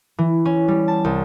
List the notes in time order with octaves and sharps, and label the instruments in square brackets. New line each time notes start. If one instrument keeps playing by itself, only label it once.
[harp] E3
C#4
G3
A5
C2